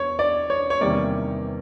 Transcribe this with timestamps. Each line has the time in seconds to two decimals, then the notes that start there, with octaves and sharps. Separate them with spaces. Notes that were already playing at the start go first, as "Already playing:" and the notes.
Already playing: E2 C#5
0.19 D5
0.50 C#5
0.70 C#5
0.81 E2 C3 D#3 G3 A#3 D5